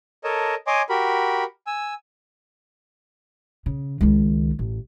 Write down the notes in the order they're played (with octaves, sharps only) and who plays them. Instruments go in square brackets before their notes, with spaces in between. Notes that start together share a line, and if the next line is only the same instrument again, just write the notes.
[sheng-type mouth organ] A4 A#4 C#5 D#5 A5
C#5 D#5 G#5 C6 D6
F#4 G4 A#4 B5
G#5 E6
[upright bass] C#3
C#2 D#3
A1